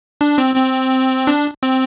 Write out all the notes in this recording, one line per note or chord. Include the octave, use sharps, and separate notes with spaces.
D4
C4
C4
D4
C4